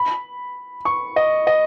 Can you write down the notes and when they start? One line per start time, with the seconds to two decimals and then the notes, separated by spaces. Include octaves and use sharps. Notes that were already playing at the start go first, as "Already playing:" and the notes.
Already playing: B5
0.85 C#6
1.16 D#5
1.47 D#5